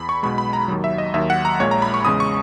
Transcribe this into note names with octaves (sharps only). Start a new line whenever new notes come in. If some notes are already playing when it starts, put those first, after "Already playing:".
Already playing: E2 B5
C#6
B1 B2 G#3 B5
B5
A#5
D#2 D#3 F#3
E5
D#5
D#2 D#3 F#3 E5
F#5
A#5
A#1 A#2 G#3 C#5
A#5
B5
C#6
E2 C#3 G#3 D#6
C#6